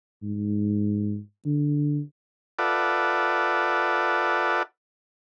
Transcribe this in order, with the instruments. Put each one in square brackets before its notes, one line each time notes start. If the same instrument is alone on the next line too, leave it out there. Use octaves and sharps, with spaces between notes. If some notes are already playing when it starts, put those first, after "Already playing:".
[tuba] G#2
D3
[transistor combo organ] F4 A4 B4 D5 E5 F#5